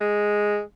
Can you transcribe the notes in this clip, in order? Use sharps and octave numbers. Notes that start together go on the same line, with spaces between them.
G#3